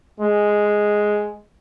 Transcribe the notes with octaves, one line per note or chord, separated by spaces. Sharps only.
G#3